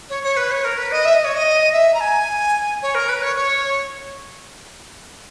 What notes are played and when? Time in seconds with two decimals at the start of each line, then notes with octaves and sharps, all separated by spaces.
0.09 C#5
0.23 C#5
0.36 B4
0.50 C#5
0.63 A#4
0.77 B4
0.91 D#5
1.05 E5
1.14 D#5
1.24 C#5
1.34 D#5
1.72 E5
1.93 A#5
2.00 G#5
2.82 C#5
2.94 A#4
3.08 B4
3.21 C#5
3.35 C#5